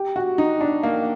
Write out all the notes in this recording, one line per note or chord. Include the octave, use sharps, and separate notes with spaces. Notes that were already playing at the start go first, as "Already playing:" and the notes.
Already playing: G4
F#4
D#4
D4
A#3